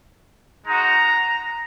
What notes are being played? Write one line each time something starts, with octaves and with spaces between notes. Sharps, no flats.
G#3 D#4 F#4 A#5